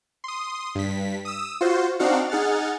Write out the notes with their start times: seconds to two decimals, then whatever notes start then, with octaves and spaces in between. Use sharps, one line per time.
0.24 C6 D#6
0.75 G2 B6
1.25 D#6 E6
1.61 F4 F#4 C5
1.99 C4 D4 D#4 F#4 F5 F#5
2.29 D#4 G#4 F#5 F6 A6